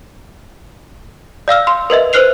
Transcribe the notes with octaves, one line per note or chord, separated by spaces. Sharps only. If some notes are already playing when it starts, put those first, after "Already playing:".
D5 F5 E6 F6
C6
A#4 B4 D#5 E5
B4 C5 F6 F#6 C7 F7